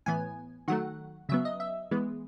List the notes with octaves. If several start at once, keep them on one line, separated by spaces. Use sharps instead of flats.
A2 E3 B3 G#5
D#3 F#3 A3 F#5
C#3 F#3 B3 E5
D#5
E5
E3 G#3 B3